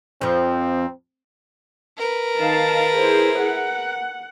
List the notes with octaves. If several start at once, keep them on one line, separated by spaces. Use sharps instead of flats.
F2 F3 C4
A#4 B4
D#3 F5 A5
E4 G#4 C5
F#5